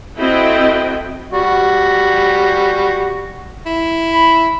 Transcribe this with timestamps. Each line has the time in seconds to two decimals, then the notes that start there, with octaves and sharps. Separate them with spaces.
0.16 C4 E4 F#4 A4 D#5 G5
1.33 G3 F#4
3.66 E4
4.13 B5